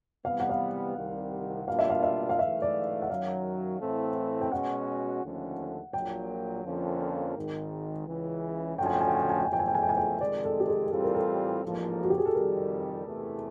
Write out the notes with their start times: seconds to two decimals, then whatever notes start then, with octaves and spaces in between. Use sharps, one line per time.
0.25 C3 E3 G3 B3 F5
0.40 F#5
0.49 F5
0.97 C2 C3 D#3 G3
1.68 B2 G3 A#3 D4 F4 F5
1.79 E5
1.90 F5
2.03 E5
2.29 F5
2.39 G#2 E3 A3 E5
2.62 D5
3.02 F#5
3.09 F#2 D#3 F#3 F5
3.81 A2 E3 A3 C4
4.41 G5
4.52 B2 G#3 C#4 F#4 F#5
5.23 D#2 D3 F3 A3 C#4
5.93 A#1 A#2 F#3 G5
6.65 F2 D3 F3 A#3 C#4
7.36 G#1 G#2 D#3
8.08 C#2 C#3 E3
8.78 D3 F3 A3 C#4 F#4 G5
8.86 G#5
8.93 G5
9.01 G#5
9.08 G5
9.15 G#5
9.22 G5
9.30 G#5
9.38 G5
9.45 G#5
9.49 E2 C#3 F3 A3 G5
9.59 G#5
9.67 G5
9.75 G#5
9.82 G5
9.89 G#5
9.97 G5
10.21 F2 C3 D#3 G#3 D5
10.44 A4
10.60 G4
10.68 G#4
10.91 A2 E3 G3 C4 F4 A4
11.03 A#4
11.14 A4
11.63 A1 G#2 F3 A#3
12.03 F#4
12.10 G4
12.18 G#4
12.25 A4
12.33 F2 C3 D#3 G3 A#4
13.05 E2 C3 E3 A3